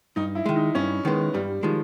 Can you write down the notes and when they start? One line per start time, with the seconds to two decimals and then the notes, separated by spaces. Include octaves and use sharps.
0.16 G2 D#4
0.35 E4
0.46 D#3 G#3
0.56 D#4
0.75 G2 C#4
1.05 D#3 G#3 B3
1.34 G2 G3
1.63 D#3 F3 G#3